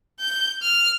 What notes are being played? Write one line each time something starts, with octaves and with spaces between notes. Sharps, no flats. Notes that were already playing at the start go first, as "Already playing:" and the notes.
G6
F6